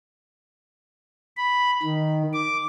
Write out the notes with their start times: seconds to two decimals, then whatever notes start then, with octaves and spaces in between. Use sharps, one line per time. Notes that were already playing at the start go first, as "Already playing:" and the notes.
1.37 B5
1.82 D#3
2.33 D6